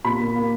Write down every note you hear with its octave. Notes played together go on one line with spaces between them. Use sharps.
A#2 B5
A#3
A#3